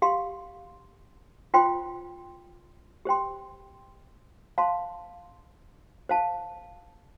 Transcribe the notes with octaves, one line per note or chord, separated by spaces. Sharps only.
G4 F5 C6
F4 C5 G5 C6
G4 C5 G5 C6
C5 F5 A5 C6
C5 F5 A5